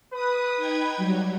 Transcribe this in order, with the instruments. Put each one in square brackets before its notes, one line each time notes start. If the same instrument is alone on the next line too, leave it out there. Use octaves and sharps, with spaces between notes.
[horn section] B4 [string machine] D#6
[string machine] D#4 G5 G#6
F#3 G3